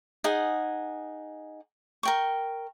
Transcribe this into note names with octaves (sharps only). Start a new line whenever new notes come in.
D#4 G#4 F#5 G#5
A#4 G5 C#6